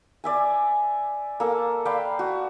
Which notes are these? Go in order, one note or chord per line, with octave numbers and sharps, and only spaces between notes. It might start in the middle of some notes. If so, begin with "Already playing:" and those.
D5 E5 G#5
A#3 A4
B4 D5 F5 G5
F#4